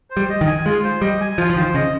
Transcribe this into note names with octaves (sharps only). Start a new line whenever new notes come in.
C5
G3
D#5
D#3
G#5
G#3 F4
C5
G3 D#5
G#5
F3 F4
F3
D#3 C5
C#3 D#5